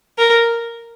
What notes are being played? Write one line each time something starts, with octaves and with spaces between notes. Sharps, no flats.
A#4